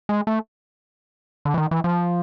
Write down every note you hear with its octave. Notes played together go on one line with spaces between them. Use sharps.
G#3
A3
D3
E3
D#3
E3
F3